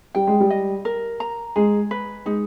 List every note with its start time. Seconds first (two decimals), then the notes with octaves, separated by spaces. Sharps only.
0.15 G3 G5
0.27 G#3
0.40 G3
0.50 D#5
0.85 A#4
1.20 A#5
1.56 G#3 G#4
1.91 B4
2.26 G#3 D#4